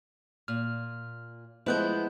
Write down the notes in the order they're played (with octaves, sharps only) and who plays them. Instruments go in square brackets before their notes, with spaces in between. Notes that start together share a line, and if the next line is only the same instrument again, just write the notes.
[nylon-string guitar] A#2 [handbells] F6
[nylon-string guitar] F3 A3 [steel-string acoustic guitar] G#3 B3 E4 [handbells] C5 F#6 G6